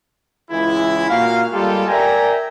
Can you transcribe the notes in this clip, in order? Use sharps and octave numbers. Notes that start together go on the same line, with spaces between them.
C#2 E3 G#3 E4
A#2 A#3 F#4 F5
G3 G#3 A#3 F4 G4 A4
A#4 D5 E5 G5 G#5 A#5